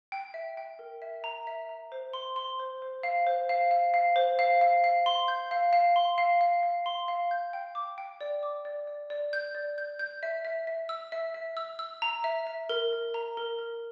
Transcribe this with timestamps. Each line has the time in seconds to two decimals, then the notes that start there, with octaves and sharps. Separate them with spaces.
0.12 G5
0.34 E5
0.57 G5
0.79 A#4
1.02 E5
1.24 A#5
1.47 E5
1.69 A#5
1.92 C5
2.13 C6
2.36 C6
2.60 C5
2.82 C5
3.03 F5
3.27 C5
3.49 F5
3.71 F5
3.94 F5
4.16 C5
4.39 F5
4.61 F5
4.84 F5
5.06 C6
5.28 G6
5.51 F5
5.73 F5
5.96 C6
6.18 F5
6.41 F5
6.63 F5
6.86 C6
7.08 F5
7.31 G6
7.53 G5
7.75 D6
7.98 G5
8.21 D5
8.43 D6
8.65 D5
8.87 D5
9.10 D5
9.33 G6
9.55 D5
9.78 G6
9.99 G6
10.23 E5
10.45 E5
10.67 E5
10.89 E6
11.12 E5
11.34 E5
11.57 E6
11.79 E6
12.02 A#5
12.24 E5
12.47 E5
12.69 A#4
12.92 A#4
13.14 A#5
13.37 A#4
13.59 A#4